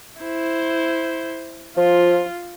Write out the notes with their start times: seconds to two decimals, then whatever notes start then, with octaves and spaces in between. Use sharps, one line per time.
0.21 E4 C5
1.77 F3 F4